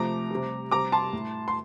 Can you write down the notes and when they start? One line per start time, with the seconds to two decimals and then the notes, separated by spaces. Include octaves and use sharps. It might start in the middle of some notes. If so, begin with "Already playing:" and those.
Already playing: C3 F3 A3 A#5 D6
0.31 C3 G3
0.71 C3 G3 A#5 D6
0.92 A5 C6
1.13 A2 A3
1.48 C6